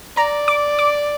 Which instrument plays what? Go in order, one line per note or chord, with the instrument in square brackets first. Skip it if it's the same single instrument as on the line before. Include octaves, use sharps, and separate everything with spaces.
[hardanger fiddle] D5 [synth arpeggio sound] A#5
[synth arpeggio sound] D6
D6